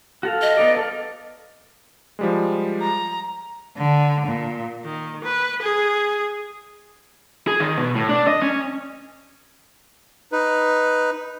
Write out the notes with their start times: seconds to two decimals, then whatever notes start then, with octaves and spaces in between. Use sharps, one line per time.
0.23 F#4 A4 F5
0.42 D#5
0.57 B3 D#4 D5
0.77 A4 D5 F5
2.19 F3 G3 G#3
2.82 A#5
3.76 D3
4.25 A#2
4.84 D#3
5.24 B4
5.61 G#4
7.47 G#4
7.60 D#3
7.78 B2
7.95 A2
8.09 D4
8.27 D#5
8.42 C#4
10.32 D#4 B4